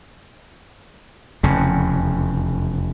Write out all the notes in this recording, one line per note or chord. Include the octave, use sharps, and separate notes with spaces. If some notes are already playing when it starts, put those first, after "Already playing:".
F1 E2 C#3